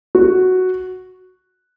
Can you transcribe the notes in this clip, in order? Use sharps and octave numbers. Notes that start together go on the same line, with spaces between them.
F#4